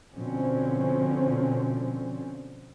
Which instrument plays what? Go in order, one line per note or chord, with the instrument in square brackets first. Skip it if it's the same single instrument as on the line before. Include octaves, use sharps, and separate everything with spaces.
[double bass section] B2 D3 F3 C4 C#4